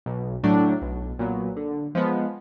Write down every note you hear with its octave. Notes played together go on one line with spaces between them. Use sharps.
B1
A2 F#3 A3 D4
B1
A#2 F#3 B3
D3
F3 G#3 B3